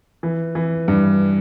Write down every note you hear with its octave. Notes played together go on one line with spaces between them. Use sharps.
E3
E3
G2